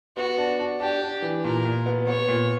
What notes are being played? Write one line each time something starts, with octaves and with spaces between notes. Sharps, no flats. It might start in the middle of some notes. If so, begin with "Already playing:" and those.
B3 F#4
D4
D4
D4 G4
D4
E3
A#2 A#4
A#2
B3
B3 C#5
A#2